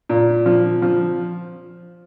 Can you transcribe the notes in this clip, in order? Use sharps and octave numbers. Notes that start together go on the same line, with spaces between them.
A#2
F3
F3